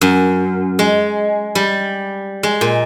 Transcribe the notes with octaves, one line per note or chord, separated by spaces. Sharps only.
F#2
G#3
G3
G#3
A#2